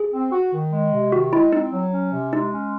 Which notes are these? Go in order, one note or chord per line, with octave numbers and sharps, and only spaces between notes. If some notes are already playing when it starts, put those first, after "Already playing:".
Already playing: G#4
C4
F#4
D#3
G#3
C3
D#3 F#4
G#3 E4
C4 D#4
F#3
C#4
C3
G#3 D#4
C#4